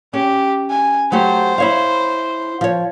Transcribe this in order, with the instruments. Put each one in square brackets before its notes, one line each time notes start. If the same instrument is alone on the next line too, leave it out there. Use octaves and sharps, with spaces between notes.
[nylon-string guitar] C#4 [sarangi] G4
[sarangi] G#5
[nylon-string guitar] F#3 A3 G4 [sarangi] C5
[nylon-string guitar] E4 C#5 F5
F3 C#5